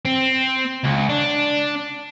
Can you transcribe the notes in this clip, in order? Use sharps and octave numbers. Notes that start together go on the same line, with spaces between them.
C4
C#2
D4